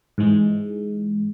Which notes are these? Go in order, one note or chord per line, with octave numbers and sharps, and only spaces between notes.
G#2 E3 G#3